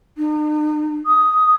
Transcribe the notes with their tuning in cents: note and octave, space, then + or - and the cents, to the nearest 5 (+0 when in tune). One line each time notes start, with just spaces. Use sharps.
D#4 -45
D#6 +10